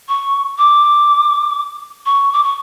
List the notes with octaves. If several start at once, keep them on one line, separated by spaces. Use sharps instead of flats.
C#6
D6
C#6
D6
C#6